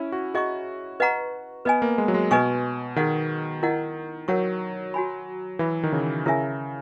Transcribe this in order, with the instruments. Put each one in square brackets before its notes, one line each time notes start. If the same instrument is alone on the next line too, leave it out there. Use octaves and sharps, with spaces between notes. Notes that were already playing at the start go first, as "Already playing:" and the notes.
Already playing: [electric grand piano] C#4 E4
F#4
[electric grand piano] F#4 [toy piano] G#4 D#5 A#5 C#6
[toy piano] B4 D#5 F#5 A#5 C#6
[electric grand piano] B3 [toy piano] B4 D#5 G#5
[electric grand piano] A#3
G#3
F#3
G#3
[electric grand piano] B2 [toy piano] B4 D#5 G#5 C#6
[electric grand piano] D#3 [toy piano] G#4 D#5 F#5
[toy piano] E4 A#4 D#5 F#5
[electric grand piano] F#3 [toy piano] A#4 C#5 F#5 C#6
[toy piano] F#4 C#5 G#5 B5
[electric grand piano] E3 [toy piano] B4 E5 B5
[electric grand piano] D#3
C#3
[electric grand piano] C#3 [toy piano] E4 A#4 E5 G#5